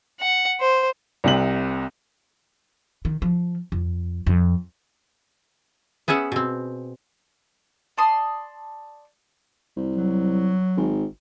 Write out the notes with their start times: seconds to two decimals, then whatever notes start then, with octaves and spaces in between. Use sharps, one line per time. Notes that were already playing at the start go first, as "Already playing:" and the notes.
0.20 F#5
0.60 C5
1.24 C2 C3 F#7
3.05 D#3
3.22 F3
3.72 F2
4.27 F2
6.08 B3 C#4 G#4 E5 F#5
6.32 B2 C4
7.97 D5 A5 C6 D#6
9.76 C2
9.96 F#3
10.77 G#1